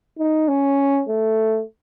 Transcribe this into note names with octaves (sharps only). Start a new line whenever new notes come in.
D#4
C#4
A3